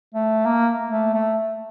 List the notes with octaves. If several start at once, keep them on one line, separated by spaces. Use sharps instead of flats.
A3
A#3
A3
A3